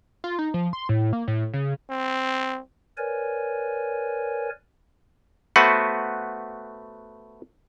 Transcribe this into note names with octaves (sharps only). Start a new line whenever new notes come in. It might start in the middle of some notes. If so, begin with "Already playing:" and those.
F4
D#4
F3
C6
A2
A#3
A2
C#3
C4
A#4 B4 C#5 D5 G#5
A3 B3 F#4 B4 C5 F#5